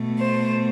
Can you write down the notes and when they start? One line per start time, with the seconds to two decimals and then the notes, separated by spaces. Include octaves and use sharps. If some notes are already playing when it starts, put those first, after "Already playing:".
Already playing: B2 A3
0.18 C5